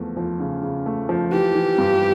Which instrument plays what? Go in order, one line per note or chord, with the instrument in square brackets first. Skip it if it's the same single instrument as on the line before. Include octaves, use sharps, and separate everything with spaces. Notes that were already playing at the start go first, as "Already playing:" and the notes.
Already playing: [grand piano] E2 F3 A3
F3
C#3
C#3
A3
F3
[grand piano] E3 [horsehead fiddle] G4
[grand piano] E3
G2